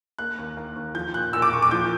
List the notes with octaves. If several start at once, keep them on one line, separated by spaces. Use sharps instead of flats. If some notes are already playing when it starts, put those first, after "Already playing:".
A#3 F#6
D#2
A#3
D#2
F3 G6
A#2 F#6
A#2 E6
D6
A#2 C#6
D6
F3 G6